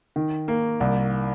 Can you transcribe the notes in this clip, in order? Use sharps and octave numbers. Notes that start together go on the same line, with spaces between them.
D#3
A#3
C2